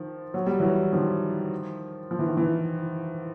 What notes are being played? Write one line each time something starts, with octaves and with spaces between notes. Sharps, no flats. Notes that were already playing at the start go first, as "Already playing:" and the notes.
Already playing: D#3 F3
F#3
G3
E3 F#3
D#3 F3
F3
E3
D#3
E3